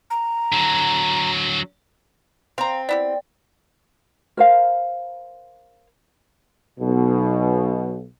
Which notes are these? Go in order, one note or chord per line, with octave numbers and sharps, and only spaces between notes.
A#5
D3 F#3
C4 F5 A#5
B3 E4 G4 D5
A#4 C5 F5
B1 B2